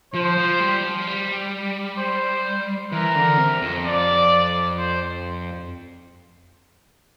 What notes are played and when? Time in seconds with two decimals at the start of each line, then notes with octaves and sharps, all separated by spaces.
0.14 F3 C5
0.37 F3
0.60 G3
0.83 F3
1.07 G3
1.99 C5
2.92 E3 A#4
3.16 D3
3.38 C3
3.62 F2
3.85 D5
4.78 C5